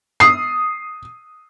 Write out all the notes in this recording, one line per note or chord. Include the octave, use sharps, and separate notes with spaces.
D#6 C7